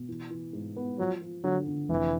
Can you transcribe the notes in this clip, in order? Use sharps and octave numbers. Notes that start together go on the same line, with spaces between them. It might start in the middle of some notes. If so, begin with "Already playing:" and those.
Already playing: B2
E3
E3
G#2
B3
F3 F#3
F3
D3 F#3
D3
F1 E3